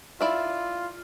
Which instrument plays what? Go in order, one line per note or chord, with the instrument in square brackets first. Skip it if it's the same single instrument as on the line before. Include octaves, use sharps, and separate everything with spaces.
[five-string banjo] E4 D5 E5 [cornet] F4